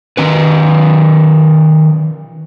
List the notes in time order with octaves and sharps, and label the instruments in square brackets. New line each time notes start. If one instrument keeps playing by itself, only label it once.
[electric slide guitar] D#3 C#4 B4